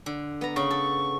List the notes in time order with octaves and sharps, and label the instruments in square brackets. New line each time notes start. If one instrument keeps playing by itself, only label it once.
[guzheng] D3
B3 A#5
[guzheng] C#3 [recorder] C#6
[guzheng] A4